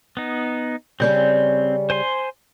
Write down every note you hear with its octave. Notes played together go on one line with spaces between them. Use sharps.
B3 D#4
C#3 G3 C4 C#4 G6
C5 G#5 C6